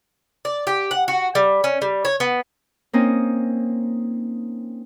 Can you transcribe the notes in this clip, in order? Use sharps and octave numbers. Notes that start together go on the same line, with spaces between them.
D5
G4
F#5
F#4
G3
C#4
G3
C#5
B3
A#3 C4 C#4 D#4 D#5